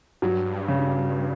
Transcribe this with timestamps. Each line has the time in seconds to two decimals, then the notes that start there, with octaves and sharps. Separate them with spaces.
0.22 G2 F#3
0.68 C#3